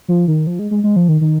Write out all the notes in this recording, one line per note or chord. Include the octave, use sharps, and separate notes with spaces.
F3
D#3
F3
G#3
G#3
G#3
F3
D#3
D#3